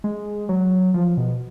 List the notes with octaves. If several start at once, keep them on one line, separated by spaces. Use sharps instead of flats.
G#3
F#3
F3
B2